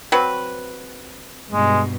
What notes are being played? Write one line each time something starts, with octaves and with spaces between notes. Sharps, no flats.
F#3 C4 B4
G2 B2 G#3